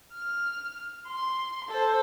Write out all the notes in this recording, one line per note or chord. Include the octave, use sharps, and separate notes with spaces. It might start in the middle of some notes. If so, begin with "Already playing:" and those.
F6
C6
A4 C5